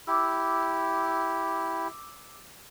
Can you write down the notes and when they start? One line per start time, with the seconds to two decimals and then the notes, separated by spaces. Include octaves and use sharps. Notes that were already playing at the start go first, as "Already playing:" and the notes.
0.07 E4 G4 D6 E6